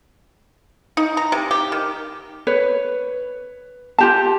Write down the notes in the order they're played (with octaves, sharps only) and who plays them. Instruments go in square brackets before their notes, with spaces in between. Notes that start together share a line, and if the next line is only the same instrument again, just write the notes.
[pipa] D#4
A#5
C3
G4
D#3
[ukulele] B4 C#5
F4 G4 A5